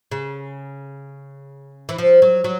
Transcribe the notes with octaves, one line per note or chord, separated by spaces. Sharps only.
C#3
E3
F3
F#3
F#3